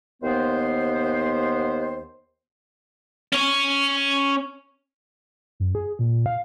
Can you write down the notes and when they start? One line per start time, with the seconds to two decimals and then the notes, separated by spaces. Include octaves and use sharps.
0.22 D#2 B3 C5
3.33 C#4 C#5
5.60 F#2
5.75 G#4
5.99 A#2
6.26 F5